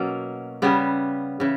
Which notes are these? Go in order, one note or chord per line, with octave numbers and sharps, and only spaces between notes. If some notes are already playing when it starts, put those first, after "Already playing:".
Already playing: B2 F#3 A#3 C#4
C#3 G3 B3
C#3 E3